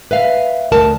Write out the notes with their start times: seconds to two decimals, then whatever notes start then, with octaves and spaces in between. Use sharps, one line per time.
0.11 B4 E5 F5
0.72 D2 A#4 A5